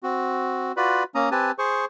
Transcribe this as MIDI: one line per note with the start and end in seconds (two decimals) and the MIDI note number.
0.03 0.72 60
0.03 0.72 66
0.77 1.03 65
0.77 1.03 66
0.77 1.03 71
0.77 1.03 74
0.77 1.03 83
1.15 1.29 58
1.15 1.29 61
1.15 1.29 82
1.15 1.29 87
1.31 1.51 60
1.31 1.51 67
1.31 1.51 71
1.31 1.51 80
1.31 1.51 81
1.59 1.85 68
1.59 1.85 72
1.59 1.85 85